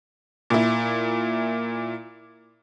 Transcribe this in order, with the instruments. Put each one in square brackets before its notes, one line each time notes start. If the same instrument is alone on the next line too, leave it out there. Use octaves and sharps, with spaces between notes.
[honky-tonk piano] A#2 E4